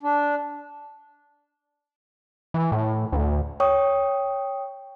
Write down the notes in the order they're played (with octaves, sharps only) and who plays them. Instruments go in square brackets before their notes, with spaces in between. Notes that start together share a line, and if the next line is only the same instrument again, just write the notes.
[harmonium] D4
[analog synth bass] E3
A2
D2
[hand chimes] C#5 G5 C#6 D#6